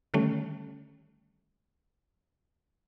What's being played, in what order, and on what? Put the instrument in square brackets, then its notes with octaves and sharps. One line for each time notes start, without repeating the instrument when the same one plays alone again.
[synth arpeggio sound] D3 D#3 G3 A3 C#4